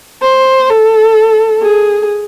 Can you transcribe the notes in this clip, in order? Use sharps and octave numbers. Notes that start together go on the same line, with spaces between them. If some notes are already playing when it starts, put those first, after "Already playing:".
C5
A4
G#4